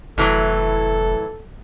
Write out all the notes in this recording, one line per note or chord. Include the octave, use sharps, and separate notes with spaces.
F1 A2 E3 F#3 A4